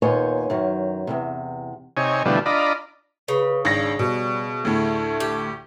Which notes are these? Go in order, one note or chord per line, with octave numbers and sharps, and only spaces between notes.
D#2 A#2 B3 C5 C#5 G#5
F#2 D#3 F#3
E2 G2 C3
C3 D#4 C#5 G#5
B2 D3 E3 F3 G3 A3
D4 F4 D5 D#5 A#5 B5
C#3 B4
G#1 D4 A#6
B2 G3
D2 A2 A3
G4